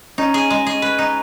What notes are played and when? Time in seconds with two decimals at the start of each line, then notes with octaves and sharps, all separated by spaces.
0.18 C#4 D#4
0.34 G#4
0.50 G#3
0.67 G#4
0.82 B4
0.99 D#4